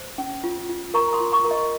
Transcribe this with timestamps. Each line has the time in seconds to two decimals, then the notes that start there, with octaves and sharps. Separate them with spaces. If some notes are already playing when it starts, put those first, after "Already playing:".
Already playing: C5
0.18 C#4
0.44 F4
0.69 F4
0.94 A#4 A#5 C#6
1.13 C6 D#6
1.20 F4
1.32 A#5 C#6
1.45 A#4
1.51 D#5